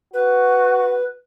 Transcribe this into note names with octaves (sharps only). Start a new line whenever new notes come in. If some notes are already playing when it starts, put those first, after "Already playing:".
F#4 B4